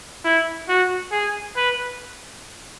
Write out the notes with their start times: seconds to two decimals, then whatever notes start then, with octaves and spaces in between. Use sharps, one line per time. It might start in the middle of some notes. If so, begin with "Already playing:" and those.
0.24 E4
0.69 F#4
1.12 G#4
1.57 B4